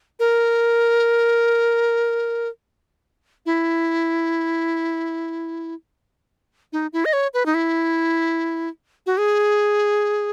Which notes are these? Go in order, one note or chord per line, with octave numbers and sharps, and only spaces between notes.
A#4
E4
D#4
E4
D#5
C#5
B4
D#4
E4
F#4
G#4